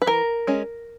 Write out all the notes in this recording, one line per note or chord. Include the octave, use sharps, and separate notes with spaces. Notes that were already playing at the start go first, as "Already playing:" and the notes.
B4
E3 A#4
G#3 C#4